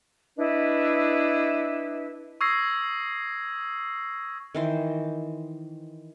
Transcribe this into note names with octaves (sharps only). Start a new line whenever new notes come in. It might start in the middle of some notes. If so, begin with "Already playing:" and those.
D4 E4 B4 D#5
C#6 D#6 E6 G#6 A#6 C7
D#3 E3 C5